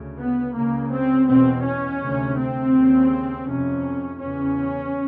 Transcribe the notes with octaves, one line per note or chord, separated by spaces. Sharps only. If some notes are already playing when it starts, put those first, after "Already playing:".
Already playing: D2 C#3
B3
C#2 C#3 A#3
C4
E2 B2 C4
C#4
D2 C3
C4
D#2 C#3
F2 C3 C#4
E2 C#3 C#4